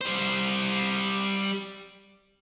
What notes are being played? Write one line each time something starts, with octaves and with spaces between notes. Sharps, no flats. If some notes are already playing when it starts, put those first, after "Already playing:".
G3 C5